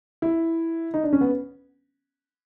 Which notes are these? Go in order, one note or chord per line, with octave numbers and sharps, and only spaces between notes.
E4
D#4
D4
C#4
B3